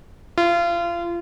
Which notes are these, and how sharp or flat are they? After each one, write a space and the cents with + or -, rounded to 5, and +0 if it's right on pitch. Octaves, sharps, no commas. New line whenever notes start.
F4 -30